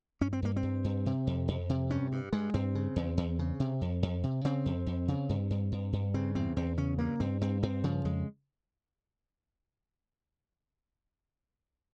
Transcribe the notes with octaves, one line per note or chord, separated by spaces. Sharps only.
G2 C#4
C4
G2 A#3
C4
G2
G2
C3
F2
F2
C3
G2 C#4
G2
G2 G#3
G2 C4
C#3
E2
E2
C#3
C3
F2
F2
C3
C#3 C4
F2
F2
C#3
G2
G2
G2
G2
C#3 C4
E2 C4
E2 C4
C#3 C#4
G2 A#3
G2 C4
G2 C4
G2 C4
C#3 F3
F2 G#3